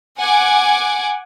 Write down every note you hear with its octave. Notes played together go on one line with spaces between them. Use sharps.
F#5 G#5 D6